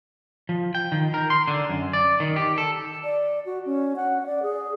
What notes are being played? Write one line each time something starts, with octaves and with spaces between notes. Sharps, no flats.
F3
G5
D#3
A#4
C6
D3
F#2
D5
D#3
G4
A4
D5
F#4
C#4
F#5
D5
G#4